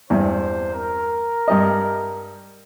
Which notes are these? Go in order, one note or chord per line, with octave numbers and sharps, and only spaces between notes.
E2 G2 C4 C5
A#4
G2 G3 D#5